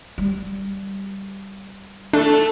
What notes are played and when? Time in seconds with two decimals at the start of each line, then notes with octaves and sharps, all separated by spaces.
0.18 G3
2.13 A3 D4 A4